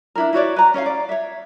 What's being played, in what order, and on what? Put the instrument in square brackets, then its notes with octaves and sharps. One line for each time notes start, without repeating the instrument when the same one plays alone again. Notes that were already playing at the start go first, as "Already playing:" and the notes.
[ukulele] D4 E4 A#4
E4 F#4 C#5 D5
B4 A#5
C#4 C#5 D#5 F5
D5
C#5 E5